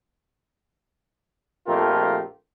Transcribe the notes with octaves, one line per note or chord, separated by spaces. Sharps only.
A#1 F2 A3 F4 G4 A#4